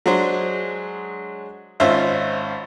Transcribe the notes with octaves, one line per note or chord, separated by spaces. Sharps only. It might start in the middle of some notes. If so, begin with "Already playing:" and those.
F#3 G#3 D4 G#4 C5
G#1 C#4 F4 C5 E5